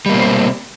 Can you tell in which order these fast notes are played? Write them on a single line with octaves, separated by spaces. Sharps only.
G3 A#3 B2 C4